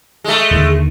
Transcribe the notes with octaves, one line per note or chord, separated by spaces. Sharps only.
G#3 A3
D#2 D3 D#3